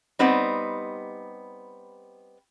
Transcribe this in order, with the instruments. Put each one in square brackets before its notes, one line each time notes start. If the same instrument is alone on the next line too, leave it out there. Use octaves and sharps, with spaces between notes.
[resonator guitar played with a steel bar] G3 B3 C4 D#4